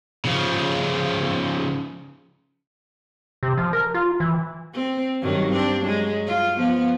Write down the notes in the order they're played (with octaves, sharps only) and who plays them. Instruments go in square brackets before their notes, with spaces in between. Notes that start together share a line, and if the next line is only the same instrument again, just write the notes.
[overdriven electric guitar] C#3 F3
[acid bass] C3
F3
A#4
F4
E3
[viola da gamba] C4
G2 D#3 F#3
C4 D4
F#3 G#3
F4
F3 B3